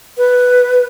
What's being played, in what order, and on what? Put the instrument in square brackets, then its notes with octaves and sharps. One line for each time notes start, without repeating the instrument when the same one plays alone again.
[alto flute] B4